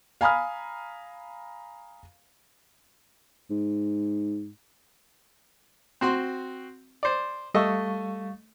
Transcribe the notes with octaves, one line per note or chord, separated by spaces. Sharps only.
F5 G#5 A#5 B5 D#6 F6
G#2
C4 F#4 C6
C5 D5
G3 A3 D#5 F5 C#6 E6